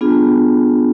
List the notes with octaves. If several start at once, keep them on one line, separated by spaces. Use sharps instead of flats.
B3 D4 F4 G#4